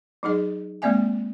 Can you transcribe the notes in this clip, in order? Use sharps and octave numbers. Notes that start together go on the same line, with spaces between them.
F#3 D#4 G#4 D#5
G#3 A#3 C4 D5 E5 G#5